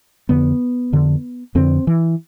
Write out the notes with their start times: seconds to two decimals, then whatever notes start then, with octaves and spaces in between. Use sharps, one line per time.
0.29 F2 D3 B3
0.92 F2 D3
1.55 F2 D3 C4
1.87 E3